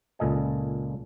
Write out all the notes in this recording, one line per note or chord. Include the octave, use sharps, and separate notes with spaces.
C#2 A#2 A4 D#5 G#5